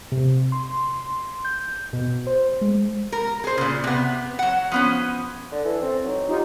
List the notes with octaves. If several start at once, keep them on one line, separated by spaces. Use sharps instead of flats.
C3
C6
G6
B2
C5
G#3
A#4
G#4 C5
A#2 C#3
C3 B3
F#3 F#5
F3 B3 C#4
D3
E3 A4
C4
F#3 D#4
D#4 F4 G4